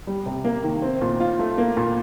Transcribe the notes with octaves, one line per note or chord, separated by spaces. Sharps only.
G3
C3
A#3
D#3
C4
A#2
F4
A3
A#3
A#2